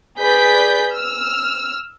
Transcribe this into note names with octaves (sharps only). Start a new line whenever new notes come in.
G#4 B4 D5 G6 B6
E6 F6